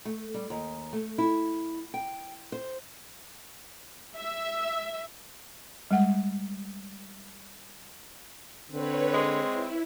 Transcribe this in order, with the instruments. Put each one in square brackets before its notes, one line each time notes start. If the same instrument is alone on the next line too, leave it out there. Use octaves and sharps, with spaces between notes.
[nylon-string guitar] A3
G3
D#2
A3
E4
G5
C5
[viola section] E5
[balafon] G3 G#3 F#5
[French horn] D3 [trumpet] C4 [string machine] B4 C#5
[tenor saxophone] G#3
[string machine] E4